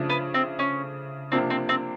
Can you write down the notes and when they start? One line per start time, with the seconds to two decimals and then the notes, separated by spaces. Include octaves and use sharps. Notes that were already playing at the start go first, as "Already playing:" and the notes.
Already playing: C#3 F3 A3 D4
0.10 B3
0.34 C4
0.59 C#4
1.32 C3 F3 A#3 C4 D4
1.50 C4
1.69 C4